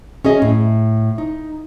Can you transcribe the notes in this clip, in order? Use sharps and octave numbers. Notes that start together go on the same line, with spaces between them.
C#4 G#4 D#5
A2
D#4